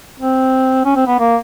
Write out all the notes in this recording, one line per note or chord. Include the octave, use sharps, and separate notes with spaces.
C4
C#4
C4
B3
A#3